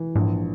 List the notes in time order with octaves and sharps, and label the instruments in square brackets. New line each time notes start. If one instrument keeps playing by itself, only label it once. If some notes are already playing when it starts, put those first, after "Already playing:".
Already playing: [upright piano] E3
[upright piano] A#1 [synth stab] G#2